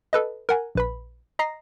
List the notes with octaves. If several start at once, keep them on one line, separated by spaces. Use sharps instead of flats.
A4 B4 D#5
A#4 F#5 G#5
A#1 B4 B5
D#5 A#5 A#6 C7